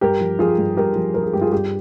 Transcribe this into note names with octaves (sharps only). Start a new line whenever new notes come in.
G2 G4 A#4
F3
F3 F4 G#4
G2
G2 G4 A#4
F3
F3 A#4
G#4
G2 G4
F4 G#4
G2 G4